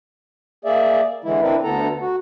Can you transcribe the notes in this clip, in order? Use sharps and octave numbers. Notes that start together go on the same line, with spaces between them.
A#3 G#4 D5 E5
D3 E3 G#3 E4
C4 D4 E4 A#4 B4
D2 D3 B3 A4 A#5
F#4